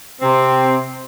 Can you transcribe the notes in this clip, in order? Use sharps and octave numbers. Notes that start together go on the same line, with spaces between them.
C3 C4